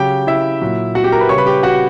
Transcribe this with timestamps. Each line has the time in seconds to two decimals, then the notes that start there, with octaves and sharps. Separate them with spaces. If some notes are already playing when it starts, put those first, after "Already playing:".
Already playing: C#3 F#3 G4 G5
0.27 E4 E5
0.61 A#2 F#3
0.95 F#4 F#5
1.04 G4 G5
1.12 A#4 A#5
1.20 B4 B5
1.29 C#3 G3 C#5 C#6
1.38 B4 B5
1.46 G4 G5
1.63 F#4 F#5